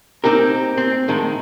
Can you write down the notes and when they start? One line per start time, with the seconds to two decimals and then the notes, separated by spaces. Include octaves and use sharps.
0.24 C4 D#4 G4 A#4
0.77 C4
1.08 A2 D#3 G#3